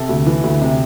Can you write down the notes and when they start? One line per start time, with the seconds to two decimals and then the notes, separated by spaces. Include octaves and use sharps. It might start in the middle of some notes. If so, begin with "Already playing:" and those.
Already playing: C3 A4
0.09 D2
0.27 E3
0.43 D2
0.62 C3